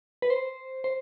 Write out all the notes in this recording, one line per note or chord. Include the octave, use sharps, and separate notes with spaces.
B4
C5
C5